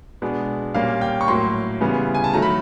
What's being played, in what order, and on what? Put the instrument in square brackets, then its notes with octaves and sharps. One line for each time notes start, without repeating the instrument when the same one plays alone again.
[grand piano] B2 G#3 B3 D4
A#2 G3 A#3 C#4 F5
G5
C#6
A2 F#3 A#3 C6
C#3 E3 G3 B3
G#5
A5
D#3 F#3 A3 A#5
B5